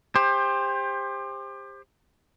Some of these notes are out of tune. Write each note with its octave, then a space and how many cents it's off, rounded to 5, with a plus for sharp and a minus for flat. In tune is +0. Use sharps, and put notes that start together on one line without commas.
G4 +30 C5 +15